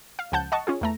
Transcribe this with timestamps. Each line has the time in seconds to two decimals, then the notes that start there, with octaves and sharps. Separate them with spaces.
0.19 F5
0.32 C#2 F3 F#5 A5 G6
0.52 D#5 F#5 A5 C#6
0.67 C#4 F4 G#4
0.81 E2 A3 A#5